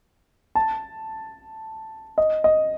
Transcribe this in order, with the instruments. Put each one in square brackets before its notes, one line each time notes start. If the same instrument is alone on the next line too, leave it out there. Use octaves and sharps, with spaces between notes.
[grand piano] A5
D#5
D#5